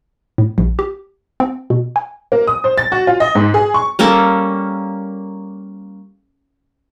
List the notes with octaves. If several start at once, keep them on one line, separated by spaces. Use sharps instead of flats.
A2
A#1
G4
C4
B2
G#5
A#3
D#6
C5
A6
F#4
F4
D#5
G#2
G#4
C#6
G3 A#3 C#4 A4